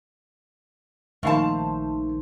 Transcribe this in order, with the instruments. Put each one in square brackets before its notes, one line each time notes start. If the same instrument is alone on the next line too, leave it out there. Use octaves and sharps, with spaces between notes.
[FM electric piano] A#1 D#3 C5 [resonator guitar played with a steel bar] A3 F5 A5